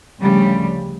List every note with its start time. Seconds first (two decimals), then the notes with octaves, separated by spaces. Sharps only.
0.21 D2 C#3 F3 G3